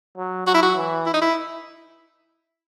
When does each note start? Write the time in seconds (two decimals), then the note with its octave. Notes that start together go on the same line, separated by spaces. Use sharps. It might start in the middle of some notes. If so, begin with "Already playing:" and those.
0.17 F#3
0.47 F#3 F#4
0.54 E4
0.63 F#4
0.76 E3
1.06 E4
1.14 D#4
1.21 E4